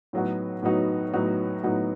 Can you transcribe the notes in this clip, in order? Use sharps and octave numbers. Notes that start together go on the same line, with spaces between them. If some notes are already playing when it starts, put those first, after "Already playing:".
A2 F#3 B3 D#4 F#4
A2 F#3 B3 D#4 F#4
A2 F#3 B3 D#4 F#4
A2 F#3 B3 D#4 F#4